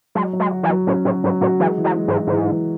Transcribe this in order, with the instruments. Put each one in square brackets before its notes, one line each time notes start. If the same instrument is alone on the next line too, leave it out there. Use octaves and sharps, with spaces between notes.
[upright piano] F#3 [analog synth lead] G#3
[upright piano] F#3
[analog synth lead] G#3
[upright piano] F#4
[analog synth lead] E3
[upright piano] F#3
[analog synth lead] A2 [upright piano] C#4
[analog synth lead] A2 [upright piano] F#3
[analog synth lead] G#2 [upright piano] F#3
[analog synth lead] A2 [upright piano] F#4
[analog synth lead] E3 [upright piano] G#3
[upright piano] E3
[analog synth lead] F#3
[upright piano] G#3
[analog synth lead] G#2
[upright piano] E3
[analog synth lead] G#2 [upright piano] E3
[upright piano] E3